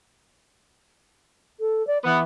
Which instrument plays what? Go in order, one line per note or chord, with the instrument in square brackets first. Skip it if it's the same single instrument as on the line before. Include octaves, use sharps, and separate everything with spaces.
[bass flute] A4
D5
[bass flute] E3 [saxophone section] B3